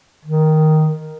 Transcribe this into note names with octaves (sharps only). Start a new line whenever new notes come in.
D#3